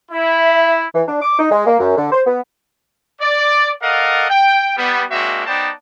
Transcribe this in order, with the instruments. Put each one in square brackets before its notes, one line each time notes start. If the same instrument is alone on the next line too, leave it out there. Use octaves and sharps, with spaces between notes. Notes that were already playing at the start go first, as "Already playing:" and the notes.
[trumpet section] E4 [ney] E5
[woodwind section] E3
D4
D6
D#4
G#3
A#3
F#2
D3
C5
B3
[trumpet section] D5
A4 A#4 D5 D#5 F5 F#5
G5
G3 B3
G#3 A#3 C4 D4 F#4 E5
B3 D#4 C5 D5 G5 A5